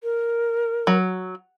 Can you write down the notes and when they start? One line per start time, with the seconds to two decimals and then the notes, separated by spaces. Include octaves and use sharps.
0.03 A#4
0.87 F#3